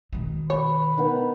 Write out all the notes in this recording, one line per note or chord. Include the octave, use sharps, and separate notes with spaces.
B2 D#3
B4 C#5
D#3 B3